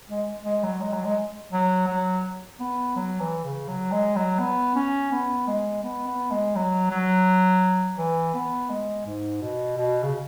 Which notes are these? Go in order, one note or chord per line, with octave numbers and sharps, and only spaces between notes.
G#3
G#3
F#3
G#3
F#3
G#3
F#3
F#3
B3
F#3
E3
C#3
F#3
G#3
F#3
B3
C#4
B3
G#3
B3
B3
G#3
F#3
F#3
E3
B3
G#3
G#2
B2
B2
C#3